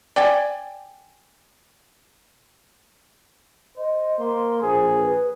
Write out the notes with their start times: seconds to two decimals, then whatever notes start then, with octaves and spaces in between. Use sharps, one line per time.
0.16 D5 G5 G#5
3.77 C5 D#5
4.19 A#3 C6
4.62 A#1 G#4 C5
4.98 B4